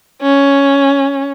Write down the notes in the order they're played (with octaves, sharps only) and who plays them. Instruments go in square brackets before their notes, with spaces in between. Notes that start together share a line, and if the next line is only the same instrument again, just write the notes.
[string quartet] C#4